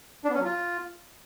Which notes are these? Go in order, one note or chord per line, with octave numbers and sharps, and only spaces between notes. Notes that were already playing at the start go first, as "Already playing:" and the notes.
D4
B3
C#4
F#3
F4